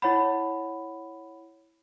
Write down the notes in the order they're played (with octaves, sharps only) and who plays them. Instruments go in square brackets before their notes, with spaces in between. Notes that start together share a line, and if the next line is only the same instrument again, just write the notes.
[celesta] E4 C#5 F#5 B5